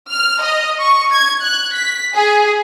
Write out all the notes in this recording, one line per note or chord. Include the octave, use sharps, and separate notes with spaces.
F6
D#5
C#6
G#6
F#6
B6
G#4